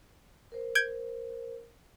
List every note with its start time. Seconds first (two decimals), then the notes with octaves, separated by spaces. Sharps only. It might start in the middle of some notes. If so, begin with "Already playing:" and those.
0.52 A#4 C5
0.75 G6 G#6 D7